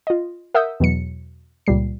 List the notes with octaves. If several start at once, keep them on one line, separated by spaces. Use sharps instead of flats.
F4 D#5
A#4 E5 F#5 D#6 E6 G6
E2 B2 F#3 C#7
C#2 A#2 G3 C7